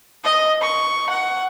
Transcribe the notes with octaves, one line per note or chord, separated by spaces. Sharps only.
D#5
C#6
F#5